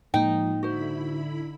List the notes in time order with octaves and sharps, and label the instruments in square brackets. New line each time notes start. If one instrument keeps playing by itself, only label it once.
[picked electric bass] A2 G#3 A#3 [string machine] F3 [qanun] D#4 [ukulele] G5
[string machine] D3 E4 B5 [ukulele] F#4 C5